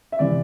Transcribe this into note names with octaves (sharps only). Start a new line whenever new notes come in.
E5
C3 E3 D5